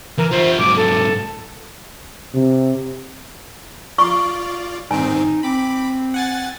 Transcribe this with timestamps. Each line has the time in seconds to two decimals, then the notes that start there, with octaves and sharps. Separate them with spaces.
0.18 E3 A#4
0.31 F4 C5 E5
0.58 G#2 F#3 D6
0.76 A4
2.34 C3
3.98 F4 D5 C#6
4.91 G#2 D#3 C4 D#4 G#5
5.43 C4 B5 D6
6.14 F#5 G#5 A6